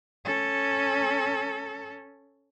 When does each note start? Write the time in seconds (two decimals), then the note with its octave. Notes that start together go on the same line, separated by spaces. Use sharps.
0.25 C#4 A4